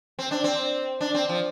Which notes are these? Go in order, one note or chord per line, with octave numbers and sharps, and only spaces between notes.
C4
D4
C4
D4
C4
F3